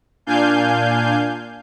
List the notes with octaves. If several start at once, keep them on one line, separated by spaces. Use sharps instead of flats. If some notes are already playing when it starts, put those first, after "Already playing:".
A#2 D4 F5 G#5 G6